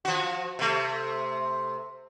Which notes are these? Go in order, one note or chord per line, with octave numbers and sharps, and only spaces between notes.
F3 F#4
C3 A3